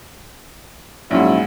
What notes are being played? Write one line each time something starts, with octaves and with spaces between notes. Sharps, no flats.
A#1 G#2 F#3 C#4 E4